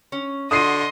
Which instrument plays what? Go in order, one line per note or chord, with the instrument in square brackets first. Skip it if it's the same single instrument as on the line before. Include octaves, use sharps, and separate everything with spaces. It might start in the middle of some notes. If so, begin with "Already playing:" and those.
[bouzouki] C#4
[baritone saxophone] D3 [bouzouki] F#4 E5 [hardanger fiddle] D#5 C6 [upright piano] D#6 C7 D#7